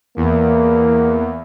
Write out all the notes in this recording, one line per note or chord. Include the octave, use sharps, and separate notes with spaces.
E2 A#3